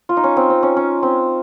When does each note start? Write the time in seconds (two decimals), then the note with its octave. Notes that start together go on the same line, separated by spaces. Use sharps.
0.09 F4
0.17 D#4
0.24 C#4
0.37 C4
0.50 C4
0.63 C#4
0.76 C#4
1.03 C4